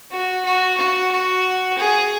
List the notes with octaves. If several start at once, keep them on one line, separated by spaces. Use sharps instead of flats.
F#4
F#4
F#4
F#4
G#4